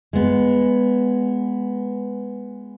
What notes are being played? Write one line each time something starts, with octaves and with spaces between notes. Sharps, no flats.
G#3 B3